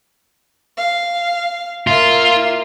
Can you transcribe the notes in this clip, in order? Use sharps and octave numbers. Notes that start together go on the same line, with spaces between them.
F5
A#3 F4 E5